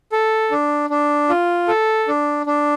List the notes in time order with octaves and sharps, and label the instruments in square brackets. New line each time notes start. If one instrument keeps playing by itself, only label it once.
[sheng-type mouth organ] A4
D4
D4
F4
A4
D4
D4